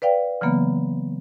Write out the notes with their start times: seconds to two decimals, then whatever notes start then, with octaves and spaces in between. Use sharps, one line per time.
0.02 B4 D5 F5 G5
0.41 C#3 E3 F#3 A#3 B3